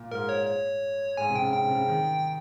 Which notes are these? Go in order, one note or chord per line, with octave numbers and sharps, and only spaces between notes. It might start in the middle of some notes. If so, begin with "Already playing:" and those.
Already playing: A#2
G#2 A#4
C#5
C#5
G#2 G#5
C3
G5
C#3
G5
C3
C#3
D#3